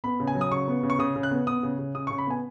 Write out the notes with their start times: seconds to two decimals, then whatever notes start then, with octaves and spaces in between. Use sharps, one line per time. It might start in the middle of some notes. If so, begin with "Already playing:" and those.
0.04 B3 B5
0.20 C#3
0.27 G#5
0.35 F#3
0.41 D#6
0.52 C#3 C#6
0.68 B3
0.83 C#3
0.90 C#6
0.99 C#3 D#6
1.16 C#3
1.23 F#6
1.31 B3
1.47 B3 D#6
1.63 C#3
1.79 C#3
1.95 C#3 D#6
2.07 C#6
2.11 C#3
2.18 B5
2.27 B3 G#5